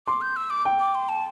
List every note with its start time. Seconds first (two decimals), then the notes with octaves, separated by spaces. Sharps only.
0.07 C6 D6
0.21 G6
0.36 E6
0.50 D6
0.65 G5
0.79 D6
0.95 C6
1.09 A5